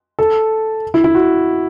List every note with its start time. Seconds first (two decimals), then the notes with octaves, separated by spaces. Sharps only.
0.19 A4
0.94 E4
1.04 E4
1.15 F#4